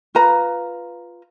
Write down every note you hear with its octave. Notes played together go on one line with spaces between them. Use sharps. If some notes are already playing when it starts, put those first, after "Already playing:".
F4 B4 A#5